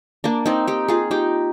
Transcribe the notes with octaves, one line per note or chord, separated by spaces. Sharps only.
A#3 D4
C4 D#4
D#4 G4
F4 G#4
D#4 G4